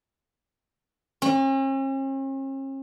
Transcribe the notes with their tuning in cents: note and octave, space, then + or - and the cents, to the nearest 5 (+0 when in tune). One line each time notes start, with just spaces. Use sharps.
C#4 -45